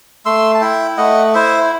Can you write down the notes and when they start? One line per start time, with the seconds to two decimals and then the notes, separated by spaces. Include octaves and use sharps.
0.26 A3 C6 E6
0.54 A5
0.61 E4 E5 G5
0.97 A3 D#5 F#5
1.34 E4 C5 E5